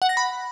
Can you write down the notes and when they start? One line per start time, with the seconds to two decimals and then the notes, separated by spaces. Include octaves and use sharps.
0.02 F#5
0.09 A#6
0.17 B5